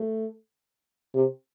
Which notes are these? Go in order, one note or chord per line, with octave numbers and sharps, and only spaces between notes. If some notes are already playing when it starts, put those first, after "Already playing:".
Already playing: A3
C3